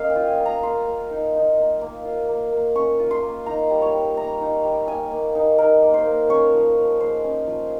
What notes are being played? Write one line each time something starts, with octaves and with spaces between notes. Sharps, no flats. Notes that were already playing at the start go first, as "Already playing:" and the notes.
Already playing: A#3 C#4 D#5 F5
G5
F4
G#5
A#3
A#5
A#3 C6
A#3
D#4
D#4
A#3
A#3
F4
A#3
A#3
C#4 C#6
F4
C6
A#3
D#4 A#5
G3
C#5
G3
A#3 A#5
D#4
G3
A#3 G#5
A#3
D#4
D#4 A#4
A#3
C5
A#3
C#4 C#5
F3
F3
G#3 C5
C#4
F3